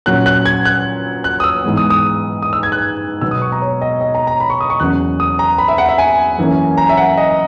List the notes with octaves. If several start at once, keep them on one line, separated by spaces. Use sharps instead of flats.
A#2 F#3 C#4 F#6
F#6
G#6
F#6
F#6
D#6
E6
G#2 E3 G#3 B3
D#6
D#6
D#6
E6
G#6
F#6
B2 F#3 B3 E6
D#6
C#6
A#5
C#5
D#5
D#5
A#5
A#5
B5
C#6
D#6
C#6
E2 C#3 F#3 A#3 C#4 F#6
D#6
A#5
B5
E5
F#5
E5
G#5
F#2 E3 A#3 C#4
A#5
E5
F#5
D#5